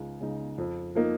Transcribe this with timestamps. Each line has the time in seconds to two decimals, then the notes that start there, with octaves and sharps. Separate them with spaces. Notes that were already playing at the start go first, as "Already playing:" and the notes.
Already playing: C#2 C#3 D#4
0.21 C#3 G#3 D#4
0.58 F2
0.95 F3 A#3 D#4